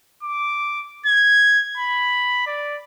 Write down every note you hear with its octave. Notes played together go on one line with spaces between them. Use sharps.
D6
G#6
B5
D5